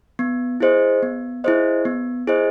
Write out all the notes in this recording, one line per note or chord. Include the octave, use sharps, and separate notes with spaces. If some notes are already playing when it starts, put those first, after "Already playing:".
B3
E4 G#4 C5 D#5
B3
E4 G#4 C5 D#5
B3
E4 G#4 C5 D#5